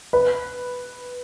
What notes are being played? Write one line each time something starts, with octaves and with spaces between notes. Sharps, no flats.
B4